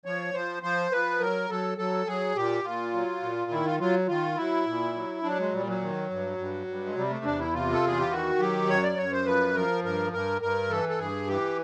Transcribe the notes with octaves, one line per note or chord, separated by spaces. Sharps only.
F3 C#5
F3 C5
F3 C5
F3 B4
F#3 A#4
F#3 A4
F#3 A4
F#3 G#4
A#2 G4
A#2 F4
F#3
A#2
D#3 E4
F4
F#3 F4
D#3 F4
F#3 E4
A#2
F#3
F#3 D4
G#3
A#2 G3
F#3
D#3
G2
G2
G2
G#3
C3 G3
A3
E2 D4
E4
C3 F4
A4
E2 G#4
G4
D#3 F#4
F#3 G4
F#2 C#5
D5
F#2 C#5
C5
F3 B4
F3 A#4
G2 A#4
G2 A#4
G2 A#4
E3 A4
A4
G2 G#4
E3 G4